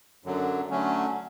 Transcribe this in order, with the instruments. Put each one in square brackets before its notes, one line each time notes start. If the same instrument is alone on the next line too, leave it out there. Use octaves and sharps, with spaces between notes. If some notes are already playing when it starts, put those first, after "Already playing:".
[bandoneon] F#2 D3 F#3
D3 F#3 A3 C#4